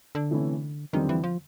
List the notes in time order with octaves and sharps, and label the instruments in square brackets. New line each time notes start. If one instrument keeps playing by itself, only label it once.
[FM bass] D3
[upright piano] C3 E3 A3 C#4 E4
[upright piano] F2 D3 G3 C4 [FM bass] D#3
[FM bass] E3
F3